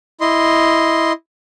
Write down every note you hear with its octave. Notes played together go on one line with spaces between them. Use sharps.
E4 D#5 C6